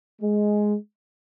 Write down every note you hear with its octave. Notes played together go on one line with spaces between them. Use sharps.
G#3